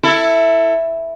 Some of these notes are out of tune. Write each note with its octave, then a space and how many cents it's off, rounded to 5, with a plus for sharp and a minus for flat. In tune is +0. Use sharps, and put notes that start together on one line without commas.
E4 +0 A4 +20